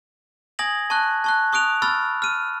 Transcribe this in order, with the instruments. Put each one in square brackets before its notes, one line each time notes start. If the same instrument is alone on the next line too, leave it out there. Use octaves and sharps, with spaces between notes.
[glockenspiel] G#5 D#6 G#6 A#6 F#7
A5 C#6 F#6
A5 C#6 F#6
C#6 D#6 F#6 D7 F7
B5 C#6 E6 F6 A6
F6 D#7